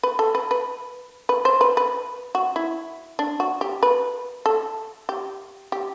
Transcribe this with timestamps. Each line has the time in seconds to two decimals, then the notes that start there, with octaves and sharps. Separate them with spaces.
0.03 B4
0.19 A4
0.35 B4
0.51 B4
1.29 B4
1.45 C5
1.61 B4
1.77 B4
2.35 F#4
2.56 E4
3.19 D4
3.40 F#4
3.61 G4
3.83 B4
4.46 A4
5.09 G4
5.72 G4